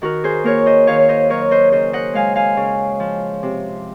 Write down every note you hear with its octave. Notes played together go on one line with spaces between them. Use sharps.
D#3 F#4 A#4
G#4 C5
A#3 A#4 C#5
C5 D#5
D#3 C#5 F5
C#5
C5 D#5
F#3 A#4 C#5
C5 D#5
C#3 C5 D#5
D#5 F#5
G#3 F5 G#5
F5 G#5
C#3
F3
C3